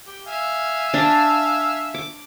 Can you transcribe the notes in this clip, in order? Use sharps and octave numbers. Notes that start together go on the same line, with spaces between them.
G4
E5 F5 G#5
D4
D6